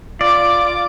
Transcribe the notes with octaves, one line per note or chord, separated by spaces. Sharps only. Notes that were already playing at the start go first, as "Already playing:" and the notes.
F4 D5 D6